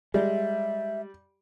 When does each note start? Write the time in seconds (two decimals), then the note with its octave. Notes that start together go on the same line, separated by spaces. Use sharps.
0.14 G3 G#3 E5